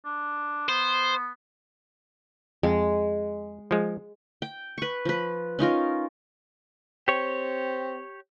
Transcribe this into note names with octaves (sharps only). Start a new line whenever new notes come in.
D4
B3 C5
F2 G#3
F3 G#3
G5
B4 C#6
F3 B4
C#4 D#4 F4 A#4
C4 G4 C#5